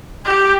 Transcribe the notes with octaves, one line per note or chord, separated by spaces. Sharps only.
G4 G5